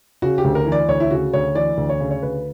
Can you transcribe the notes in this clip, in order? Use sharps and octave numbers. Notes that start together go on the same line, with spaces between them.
C#3 F#4
G4
D2
A#4
E3
D5
D2 C#5
E4
C#3 F#4
D2 C#5
E3 D5
D2
C#5
C#3
C#5
D2 B4